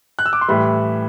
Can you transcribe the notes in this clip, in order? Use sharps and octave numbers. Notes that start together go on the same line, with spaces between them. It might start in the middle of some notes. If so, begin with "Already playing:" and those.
F#6
E6
D6
C6
A2 E3 G3 B5